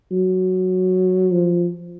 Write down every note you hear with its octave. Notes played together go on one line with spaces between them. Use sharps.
F#3
F3